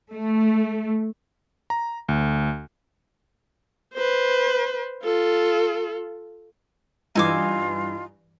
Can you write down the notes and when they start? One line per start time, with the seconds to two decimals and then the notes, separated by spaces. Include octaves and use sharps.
0.11 A3
1.70 A#5
2.09 D2
3.94 B4 C5
5.04 F4 A4
7.15 G2 E3 D#4 F4 G#5 D6 E6